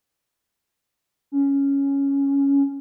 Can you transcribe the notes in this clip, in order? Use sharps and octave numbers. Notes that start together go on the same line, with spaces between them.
C#4